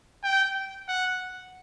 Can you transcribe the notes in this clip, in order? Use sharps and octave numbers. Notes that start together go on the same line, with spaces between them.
G5
F#5